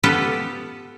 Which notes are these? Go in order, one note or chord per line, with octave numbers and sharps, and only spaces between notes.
B3 F4 G4 A4 B4